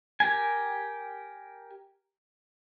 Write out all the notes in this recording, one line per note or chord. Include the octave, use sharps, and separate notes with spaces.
G4 A#4 G#5